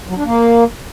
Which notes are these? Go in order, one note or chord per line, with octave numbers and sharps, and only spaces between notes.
F#3
D4
A#3